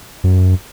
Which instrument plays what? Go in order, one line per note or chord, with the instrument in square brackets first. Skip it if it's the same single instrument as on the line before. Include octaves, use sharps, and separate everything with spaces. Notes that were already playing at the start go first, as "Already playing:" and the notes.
[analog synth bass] F#2